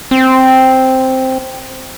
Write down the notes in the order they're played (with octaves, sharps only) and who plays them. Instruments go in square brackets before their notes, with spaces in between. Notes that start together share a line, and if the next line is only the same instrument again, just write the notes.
[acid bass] C4